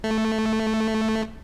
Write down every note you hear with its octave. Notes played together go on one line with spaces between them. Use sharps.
A3